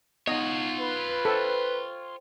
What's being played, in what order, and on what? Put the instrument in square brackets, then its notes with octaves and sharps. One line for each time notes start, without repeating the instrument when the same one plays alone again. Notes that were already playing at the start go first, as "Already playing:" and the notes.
[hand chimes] B3 D#4 F#5 [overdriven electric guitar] F4 C#5 [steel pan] D#5
[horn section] B4
[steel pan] A4 [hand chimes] C5 G5